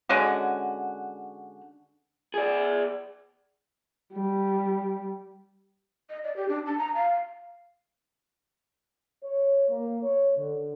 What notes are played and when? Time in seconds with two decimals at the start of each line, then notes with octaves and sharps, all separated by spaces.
0.09 D3 G#3 C#4 F#4
2.34 G#4 D5
4.13 G3
6.10 D#5
6.24 D5
6.36 G4
6.49 D4
6.66 A5
6.79 A#5
6.95 F5
9.23 C#5
9.70 A#3
10.03 C#5
10.36 D3